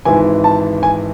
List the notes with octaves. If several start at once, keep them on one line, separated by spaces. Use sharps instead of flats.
G#1 G#2 E3 G#5
A5
G#5